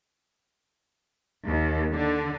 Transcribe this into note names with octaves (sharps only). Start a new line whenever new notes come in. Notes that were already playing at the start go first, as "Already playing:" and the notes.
D#2
D3